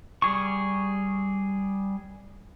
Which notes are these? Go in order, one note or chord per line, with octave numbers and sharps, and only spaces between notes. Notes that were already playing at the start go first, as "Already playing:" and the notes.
G3 G#4 C#6